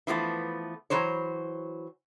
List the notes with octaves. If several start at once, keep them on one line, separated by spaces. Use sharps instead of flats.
E3 F3 A3 B3
E3 F#3 C5 C#5